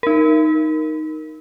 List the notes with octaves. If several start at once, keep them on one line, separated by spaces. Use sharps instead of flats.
D#4 A#4